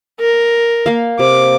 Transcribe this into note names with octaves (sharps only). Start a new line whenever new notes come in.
A#4
A#3 F5
C3 D6